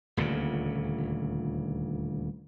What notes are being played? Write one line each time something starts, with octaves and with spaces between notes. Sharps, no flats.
D#1 D2 A#2 C#3